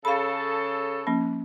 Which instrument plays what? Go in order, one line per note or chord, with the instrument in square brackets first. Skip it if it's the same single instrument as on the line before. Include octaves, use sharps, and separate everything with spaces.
[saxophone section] C#3 A4 [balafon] F5 B5
[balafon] F3 A#3 C#4